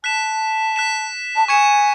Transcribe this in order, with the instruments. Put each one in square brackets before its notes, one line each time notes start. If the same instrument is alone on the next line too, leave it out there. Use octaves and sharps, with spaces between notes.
[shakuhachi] A5 [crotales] F#6 B6 E7
[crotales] F#6 B6 E7
[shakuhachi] A5
[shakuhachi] G#5 [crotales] C#6 G#6 C#7 E7